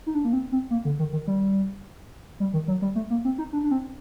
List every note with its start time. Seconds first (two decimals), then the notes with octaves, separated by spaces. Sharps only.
0.07 D#4
0.15 D4
0.25 A#3
0.33 C4
0.52 C4
0.71 A#3
0.85 D3
0.99 D#3
1.13 D#3
1.27 G3
2.40 G3
2.54 D#3
2.68 F#3
2.82 G3
2.96 A3
3.10 A#3
3.25 C4
3.38 D#4
3.53 D4
3.63 D4
3.71 C4